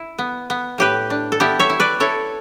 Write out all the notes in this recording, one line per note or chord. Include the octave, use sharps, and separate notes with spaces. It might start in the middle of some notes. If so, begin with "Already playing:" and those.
Already playing: E4
B3
B3
A2 G4 B4
D4
A4
B3 E4 G4
C#5 E5
E4
B4 D5
E4 A4 C#5